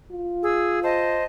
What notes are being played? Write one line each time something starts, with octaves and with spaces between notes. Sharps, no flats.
F4
G#4 E6
C5 D#5 A5